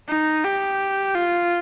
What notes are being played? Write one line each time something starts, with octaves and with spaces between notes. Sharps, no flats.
D#4
G4
F4